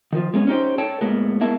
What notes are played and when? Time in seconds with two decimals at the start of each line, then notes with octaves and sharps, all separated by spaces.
0.13 D#3 F3
0.34 G#3 B3 C#4
0.47 C#4 D#4 G4 C5
0.78 A4 C#5 G5 A5
1.01 A2 G#3 A#3 B3
1.41 G#3 A#3 B3 E4 E5 A5